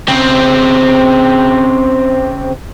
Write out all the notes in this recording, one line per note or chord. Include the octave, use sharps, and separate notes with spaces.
C#3 C4